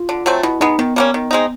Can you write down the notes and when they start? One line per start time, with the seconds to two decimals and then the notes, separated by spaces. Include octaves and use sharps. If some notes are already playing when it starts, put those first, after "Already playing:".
Already playing: F4
0.09 D3
0.26 F#3 A3 C4
0.43 B2 E4
0.61 G#3 B3 D#4
0.79 D#3 B3
0.96 G3 A#3 C#4
1.14 D#3
1.31 G#3 C4 D#4